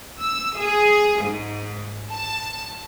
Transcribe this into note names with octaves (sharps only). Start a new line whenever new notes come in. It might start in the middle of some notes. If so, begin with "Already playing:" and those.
E6
G#4
G#2
A5